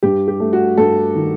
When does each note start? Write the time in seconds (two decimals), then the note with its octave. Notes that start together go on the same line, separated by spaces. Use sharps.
0.03 G2 G4
0.28 G4
0.40 A3
0.53 F#4
0.77 G2 A4
1.15 D#3